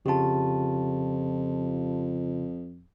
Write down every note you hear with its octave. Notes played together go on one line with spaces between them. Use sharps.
F2 C#3 F4 G4 A5